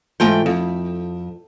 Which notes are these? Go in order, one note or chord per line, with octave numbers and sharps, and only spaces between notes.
G#2 E3 A3 F4 G5
F2